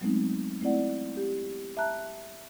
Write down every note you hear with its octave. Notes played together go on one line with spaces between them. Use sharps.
F#3 G#3 A3 B3 C4 D#4
A3 C4 E4 D5 F#5
G4
E5 A5 A#5 F#6